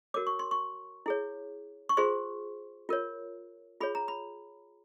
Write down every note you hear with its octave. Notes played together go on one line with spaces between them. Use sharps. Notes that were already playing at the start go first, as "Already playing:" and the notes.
F#4 A#4 C#5 D6
C#6
C6
C#6
E4 G#4 C#5
C#6
F4 G#4 C5 C6
F4 A#4 C#5
F4 G#4 C#5 B5
A#5
B5